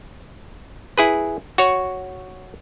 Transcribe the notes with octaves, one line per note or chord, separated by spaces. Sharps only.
E4 G#4 B4
F#4 C#5